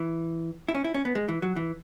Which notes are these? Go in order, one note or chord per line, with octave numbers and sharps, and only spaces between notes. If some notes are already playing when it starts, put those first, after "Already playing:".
Already playing: E3
E4
C#4
E4
C#4
B3
G#3
E3
F#3
E3